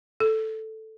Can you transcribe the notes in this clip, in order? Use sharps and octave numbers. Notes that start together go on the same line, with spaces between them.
A4